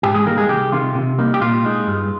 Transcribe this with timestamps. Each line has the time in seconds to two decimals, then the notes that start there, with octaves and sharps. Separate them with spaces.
0.03 G#2 G4
0.14 G#3 G#4
0.26 D#3 G3 A#3 A#4
0.38 G#3 G#4
0.49 C2 G4
0.72 C3 D#3 F4
0.95 C3
1.19 G3 A#3 D#4
1.34 G4
1.41 A#2 F4
1.64 G#3 D#4
1.87 G2